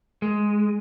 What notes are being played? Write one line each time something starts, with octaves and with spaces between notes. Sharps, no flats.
G#3